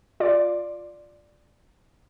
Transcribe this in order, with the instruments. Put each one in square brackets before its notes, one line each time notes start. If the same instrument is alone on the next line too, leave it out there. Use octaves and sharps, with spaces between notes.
[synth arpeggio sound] F4 D5